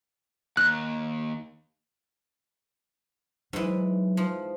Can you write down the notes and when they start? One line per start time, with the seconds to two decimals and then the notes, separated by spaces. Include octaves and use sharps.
0.57 D#2 F#6
3.53 G#2 E3 F#3
4.17 F3